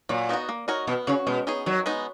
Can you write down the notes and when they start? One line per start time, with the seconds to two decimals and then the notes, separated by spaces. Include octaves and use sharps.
0.09 A#2 F#3
0.29 B3 D#4 F#4
0.49 A#3
0.68 D#4 F#4 A#4 C#5
0.87 B2 B3
1.07 C#3 F#4 C#5
1.27 B2 G#3
1.47 B3 D#4 G#4 C#5
1.66 D#3 F#3
1.86 G#3 B3 D#4